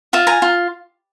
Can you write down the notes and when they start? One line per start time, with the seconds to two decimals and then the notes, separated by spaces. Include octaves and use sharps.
0.13 F4 E5
0.27 G#5 A#5
0.42 F4